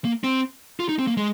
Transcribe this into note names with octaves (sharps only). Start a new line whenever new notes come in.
A#3
C4
F4
D#4
C4
A#3
G#3